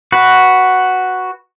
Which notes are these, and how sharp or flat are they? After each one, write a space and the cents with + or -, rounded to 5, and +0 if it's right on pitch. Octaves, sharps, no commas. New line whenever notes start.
F#4 +0 B4 +0